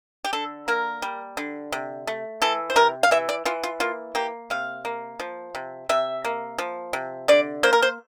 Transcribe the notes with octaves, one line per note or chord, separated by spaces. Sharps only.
G4
D3 A4
A#3 A#4
G3
D3
C3
A3
E3 A4
C5
C3 A#4
F5
E3 E5
D5
E3 F4
F4
A#3 F4
A#3 G4
C3 F5
A#3
F3
C3
C3 E5
A#3
F3
C3
D3 D5
A#3 C5
A#4
C5